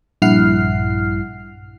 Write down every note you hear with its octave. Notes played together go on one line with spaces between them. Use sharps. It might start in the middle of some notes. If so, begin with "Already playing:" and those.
A#1 G2 E4 F#5 F6 C7